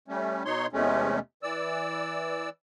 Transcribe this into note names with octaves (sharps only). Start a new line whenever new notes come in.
G3 A3 C#4
B2 D#4 C#5 C6
E2 C3 G#3 A3 C#4
E3 D5 E6